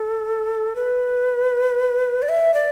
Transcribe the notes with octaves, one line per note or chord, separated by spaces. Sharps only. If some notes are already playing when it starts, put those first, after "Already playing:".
Already playing: A4
B4
D5
E5
D5